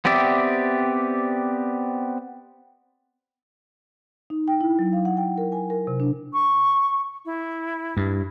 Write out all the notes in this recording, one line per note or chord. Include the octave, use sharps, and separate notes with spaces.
B3 C4 G4 D5 E5
D#4
G5
E4
F#3
F5
F#5
G5
A#4
G#5
A#4
C3
D4
C#6
E4
G2